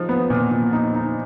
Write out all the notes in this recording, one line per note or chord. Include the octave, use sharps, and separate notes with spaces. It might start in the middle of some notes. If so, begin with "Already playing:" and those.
Already playing: F3 D#4
B3
A#2
A#2
D#4
D#4